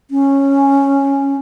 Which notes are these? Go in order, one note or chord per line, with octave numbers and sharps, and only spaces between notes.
C#4